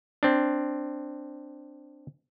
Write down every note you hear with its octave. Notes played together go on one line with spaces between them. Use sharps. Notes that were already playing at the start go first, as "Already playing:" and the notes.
C4 D4